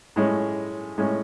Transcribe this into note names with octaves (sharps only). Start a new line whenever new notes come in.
A2 G#3 C#4
A2 G#3 C#4